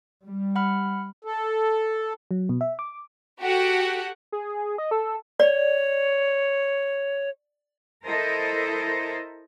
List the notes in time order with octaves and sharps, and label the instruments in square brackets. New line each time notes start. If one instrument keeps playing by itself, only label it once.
[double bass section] G3
[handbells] F#5 B5 F6
[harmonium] A4
[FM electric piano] F#3
B2
E5
D6
[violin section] F#4 G4 A4 F#5
[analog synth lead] G#4
D#5
A4
[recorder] C#5 [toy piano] D5
[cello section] E4 A4 A#4 C5 D#5